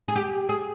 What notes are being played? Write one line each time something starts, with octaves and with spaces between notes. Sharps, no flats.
G#4
G4
G#4